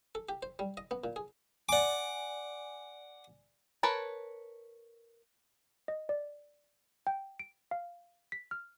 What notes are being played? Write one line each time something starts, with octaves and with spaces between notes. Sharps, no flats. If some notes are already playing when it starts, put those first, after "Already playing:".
A4
G4
C5
G3
D#5
B3
A#2
G#4
D5 F#5 G#5 D6
A#4 B4 C#5 A5
D#5
D5
G5
D7
F5
B6
F6